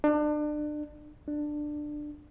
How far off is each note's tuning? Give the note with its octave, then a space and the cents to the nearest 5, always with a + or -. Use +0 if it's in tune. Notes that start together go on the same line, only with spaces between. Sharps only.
D4 +30
D4 +15